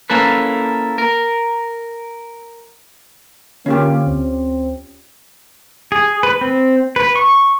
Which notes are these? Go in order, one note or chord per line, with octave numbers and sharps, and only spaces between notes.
A#3 C#4 E4 A4 B4
A#4
D3 A#3 C#4 F4 G4
D2 C4
G#4
B4
C4
B4
C#6